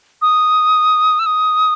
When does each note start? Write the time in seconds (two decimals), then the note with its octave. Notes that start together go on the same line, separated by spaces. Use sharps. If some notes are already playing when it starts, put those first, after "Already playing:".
0.22 D#6
1.19 E6
1.26 D#6